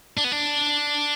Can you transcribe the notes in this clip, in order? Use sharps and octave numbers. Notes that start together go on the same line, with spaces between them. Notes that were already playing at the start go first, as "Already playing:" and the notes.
D4
B3
D4